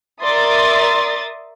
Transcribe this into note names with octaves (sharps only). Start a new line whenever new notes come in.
A#4 D5 E5 C6 D#6 A6